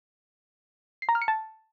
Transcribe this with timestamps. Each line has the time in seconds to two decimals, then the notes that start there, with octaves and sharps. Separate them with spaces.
1.02 C7
1.09 A#5
1.15 F6
1.22 C#7
1.28 A5